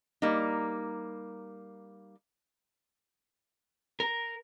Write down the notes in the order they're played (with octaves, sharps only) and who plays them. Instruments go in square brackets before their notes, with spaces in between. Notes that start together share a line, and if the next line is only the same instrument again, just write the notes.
[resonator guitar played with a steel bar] G3 A#3 D#4
[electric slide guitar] A#4